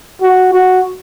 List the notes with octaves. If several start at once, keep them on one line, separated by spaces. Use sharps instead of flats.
F#4
F#4